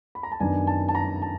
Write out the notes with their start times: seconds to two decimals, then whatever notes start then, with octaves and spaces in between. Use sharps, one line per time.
0.15 B5
0.23 A#5
0.32 A5
0.40 F#2 D#3 F#3 B3 D4 G#5
0.67 A5
0.88 A5
0.95 A#5
1.22 A5